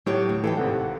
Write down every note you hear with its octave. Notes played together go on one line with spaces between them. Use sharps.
A2 F#3 G4 C#5
D2
E3 A3 A4 F5 G5
G#1 C3 F#5
F#5